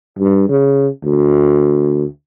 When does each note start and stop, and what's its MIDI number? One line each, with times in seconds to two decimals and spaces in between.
0.19 0.46 43
0.49 0.88 49
1.03 2.05 38